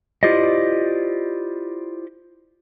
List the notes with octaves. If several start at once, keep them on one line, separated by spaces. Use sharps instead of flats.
E4 F4 G4 C5 D5 D#5